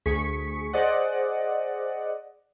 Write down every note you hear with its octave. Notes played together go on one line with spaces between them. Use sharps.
D2 G#4 C#6 B6 C#7
G#4 C5 D5 D#5 F#5